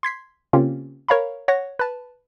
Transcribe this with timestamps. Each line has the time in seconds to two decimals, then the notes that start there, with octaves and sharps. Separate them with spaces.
0.03 C6 G#6 B6 C7
0.53 C#3 A#3 C4 C#4 F4 G4
1.08 A#4 C#5 F5 A#5 B5
1.48 C#5 F#5 A#6
1.79 B4 A5